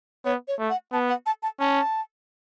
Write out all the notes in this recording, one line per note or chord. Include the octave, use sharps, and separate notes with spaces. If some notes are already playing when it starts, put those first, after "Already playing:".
B3 C#5
C#5
A3
F#5
B3 A5
F#5
A5
A5
C#4 A5